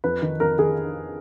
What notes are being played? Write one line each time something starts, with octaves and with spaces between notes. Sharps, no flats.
F2 B4
D#3
F2 A#4
D#3 G#4